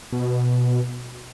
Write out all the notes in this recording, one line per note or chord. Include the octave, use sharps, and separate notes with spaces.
B2